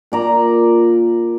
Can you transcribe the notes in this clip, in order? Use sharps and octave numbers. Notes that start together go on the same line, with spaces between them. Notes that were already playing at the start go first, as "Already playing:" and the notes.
A#2 D5 A#5